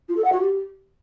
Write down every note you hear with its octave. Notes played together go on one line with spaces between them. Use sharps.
F4
A4
F#5
F#4
G4